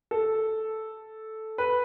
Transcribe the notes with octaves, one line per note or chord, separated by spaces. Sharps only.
A4
B4